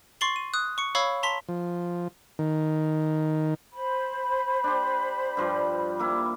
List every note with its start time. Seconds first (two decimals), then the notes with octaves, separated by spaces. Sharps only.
0.21 C6 C#6 A6 C7 F#7 G7
0.36 D#7
0.54 D#6 F#6
0.78 C#6 C#7
0.95 C#5 F5 B5 C#6 E6 G#6
1.23 A5 A#5 C6 B6 G7
1.49 F3
2.39 D#3
3.73 C5 B5
4.64 D4 G4
5.37 G2 F3 G3
5.99 G3 A#3 E4